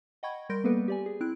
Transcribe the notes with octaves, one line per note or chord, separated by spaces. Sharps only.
D#5 F#5 G5 B5 C#6 G#6
G3 A#4 C6 G6 A#6 D7
G3 A#3 B3 A4 B4
G4 D5 G#5
G#4
C4 E4 F#6 D7